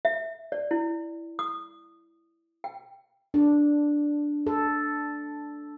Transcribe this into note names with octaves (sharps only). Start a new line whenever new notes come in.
E5
D5
E4
D#6
G5
D4
A4